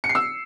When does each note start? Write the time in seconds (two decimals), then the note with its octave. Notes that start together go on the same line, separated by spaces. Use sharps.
0.04 C#7
0.09 C7
0.15 E6